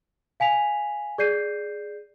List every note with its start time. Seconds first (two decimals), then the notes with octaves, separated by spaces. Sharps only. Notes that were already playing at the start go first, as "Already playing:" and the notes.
0.40 F5 G#5 B6 F7
1.18 G#4 D5 G6 C7 D#7